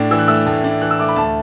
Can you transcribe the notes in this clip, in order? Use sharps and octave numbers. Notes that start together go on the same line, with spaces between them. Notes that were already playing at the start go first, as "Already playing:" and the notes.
Already playing: A2 D4
E3 E6
F#6
A3 E6
A2
D4
E3 F#6
E6
A3 D6
B5
D2 A5